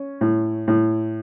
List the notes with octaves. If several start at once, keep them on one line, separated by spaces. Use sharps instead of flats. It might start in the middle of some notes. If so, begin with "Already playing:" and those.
Already playing: C#4
A2
A2